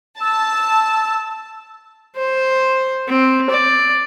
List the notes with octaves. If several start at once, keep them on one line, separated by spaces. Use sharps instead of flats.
A5 E6
C5
C4
D5